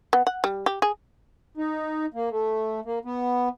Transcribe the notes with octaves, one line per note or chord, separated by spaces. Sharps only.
B3
F#5
G3
G4
G#4
D#4
A#3
A3
A#3
B3